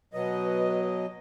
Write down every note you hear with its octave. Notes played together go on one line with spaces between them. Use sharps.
B2 F#3 B4 D#5